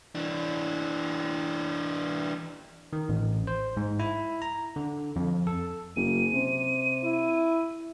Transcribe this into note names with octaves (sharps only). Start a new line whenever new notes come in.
E3 D4
D#3
A1
C5
G#2
E4
A#5
D3
F2
A4
F#1 D#7
C3
E4